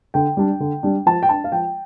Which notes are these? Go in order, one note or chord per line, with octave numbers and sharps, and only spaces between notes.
D3 G5
G3 D4
D3
G3 D4
F3 A5
G5
D4 A5
F5
F3 G5